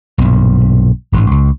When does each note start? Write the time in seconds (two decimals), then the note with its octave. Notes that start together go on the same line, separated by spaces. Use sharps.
0.18 B1 G2 A#2
1.12 A1 G#2
1.31 C#2